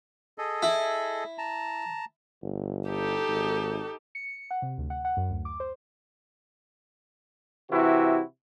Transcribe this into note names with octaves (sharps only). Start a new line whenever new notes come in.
G#4 A4 D#5
E4
A5 A#5
G1
D#4 G4 A4
G#1
C#7
F#5
C3
D2
F#5
F#5
F#2
D2
D6
C5
C3 E3 E4 F#4